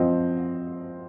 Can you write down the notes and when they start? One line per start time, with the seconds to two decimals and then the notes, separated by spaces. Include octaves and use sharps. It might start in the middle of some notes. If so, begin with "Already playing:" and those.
Already playing: F3 C4 D#5